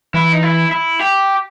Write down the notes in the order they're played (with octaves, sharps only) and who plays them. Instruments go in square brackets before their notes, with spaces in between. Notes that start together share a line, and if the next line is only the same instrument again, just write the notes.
[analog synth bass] E3 [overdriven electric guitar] E4
[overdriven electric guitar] D#4
E4
E4
G4